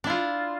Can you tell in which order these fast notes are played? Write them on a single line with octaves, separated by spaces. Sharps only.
D4 E4 F4